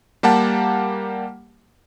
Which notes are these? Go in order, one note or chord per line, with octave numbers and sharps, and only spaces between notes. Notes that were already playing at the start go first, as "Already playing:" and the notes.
G3 A#3 G4 F#5 A5